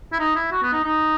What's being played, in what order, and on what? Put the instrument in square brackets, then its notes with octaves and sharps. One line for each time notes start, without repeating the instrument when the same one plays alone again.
[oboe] E4
D#4
E4
F#4
B3
D#4
D#4